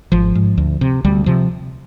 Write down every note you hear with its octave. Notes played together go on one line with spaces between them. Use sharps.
G#1 F3
G#2
D2
C3
D2 G3
C3 F3